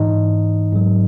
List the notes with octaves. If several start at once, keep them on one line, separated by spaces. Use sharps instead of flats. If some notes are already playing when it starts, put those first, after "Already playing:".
Already playing: G#2 E3 D#4 D#5
G#2 F#3